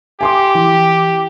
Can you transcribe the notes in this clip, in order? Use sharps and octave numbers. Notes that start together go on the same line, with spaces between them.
G4 G#5 C6 D6
E3